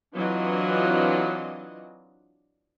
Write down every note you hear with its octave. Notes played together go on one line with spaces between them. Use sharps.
E3 F#3 C4 D4 F4 D#5